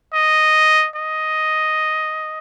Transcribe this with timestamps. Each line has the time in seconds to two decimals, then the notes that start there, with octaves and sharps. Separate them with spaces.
0.14 D#5
0.96 D#5